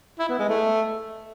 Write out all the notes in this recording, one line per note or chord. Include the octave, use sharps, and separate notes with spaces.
E4
B3
G#3
A3